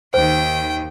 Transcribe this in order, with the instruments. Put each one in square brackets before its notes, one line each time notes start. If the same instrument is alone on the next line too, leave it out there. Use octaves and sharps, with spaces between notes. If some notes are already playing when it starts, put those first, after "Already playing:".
[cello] D#2 D#3 [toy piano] C5 [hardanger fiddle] G5